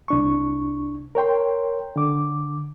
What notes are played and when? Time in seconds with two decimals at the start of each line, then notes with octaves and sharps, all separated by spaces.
0.08 C2 D4 C#6
1.15 A#4 C#5 G5 C6
1.96 D3 D6